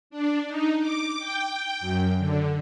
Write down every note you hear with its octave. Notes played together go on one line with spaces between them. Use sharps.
D4
D#4
D6
G5
F#2
D3